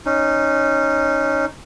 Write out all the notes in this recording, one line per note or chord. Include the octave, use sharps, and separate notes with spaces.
C#4 D#4